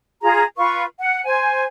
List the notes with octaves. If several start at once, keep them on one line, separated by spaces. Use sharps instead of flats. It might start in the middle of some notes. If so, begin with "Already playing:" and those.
F4 G#4 A#5
F4 B4 C#6
F#5
C5 G#5